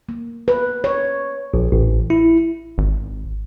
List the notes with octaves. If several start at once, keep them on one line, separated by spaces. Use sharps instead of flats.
A#3
B4
C#5
A#1
A1
E4
G#1